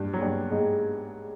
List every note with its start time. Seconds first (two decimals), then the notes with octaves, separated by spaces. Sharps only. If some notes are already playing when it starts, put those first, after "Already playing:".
Already playing: G2 G3
0.13 F#3
0.21 G2 G3
0.51 G#2 G#3